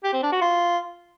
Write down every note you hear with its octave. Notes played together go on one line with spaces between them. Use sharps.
G4
C4
D4
F#4
F4